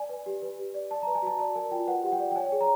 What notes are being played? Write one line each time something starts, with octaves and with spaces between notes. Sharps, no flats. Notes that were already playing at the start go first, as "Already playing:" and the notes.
Already playing: D5 G#5
B4
G4
B4
G4
D5
D5 A5
A#5
B4
G#5
F#4 A5
D5 A5
A#4 G#5
F4 G5
B4 F#5
G4 F#5
G5
D5
G5
C#5 G#5
G#4
A#5